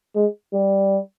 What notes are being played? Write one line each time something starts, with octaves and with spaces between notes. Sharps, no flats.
G#3
G3